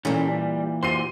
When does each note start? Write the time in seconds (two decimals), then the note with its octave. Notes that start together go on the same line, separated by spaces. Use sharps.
0.05 A#2 E3 G3 C#4 A4
0.26 G3
0.83 F#4 G4 C5 C6 C7 D#7